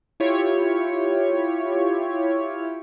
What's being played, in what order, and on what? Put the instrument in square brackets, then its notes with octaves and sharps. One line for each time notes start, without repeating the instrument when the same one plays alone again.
[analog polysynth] E4 F4 G4 C#5